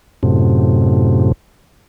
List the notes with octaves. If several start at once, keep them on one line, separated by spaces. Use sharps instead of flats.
F#2 A2 C3